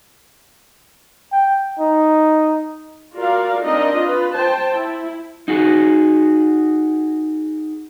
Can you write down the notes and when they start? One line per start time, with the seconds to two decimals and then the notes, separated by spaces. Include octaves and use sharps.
1.32 G5
1.79 D#4
3.15 F4 F#4 A#4 D5 F5
3.64 C4 D4 D#4 A#4 D#5
4.00 F4 B4
4.36 C5 G5 A5
4.73 E4
5.48 D#4 F#4 G#4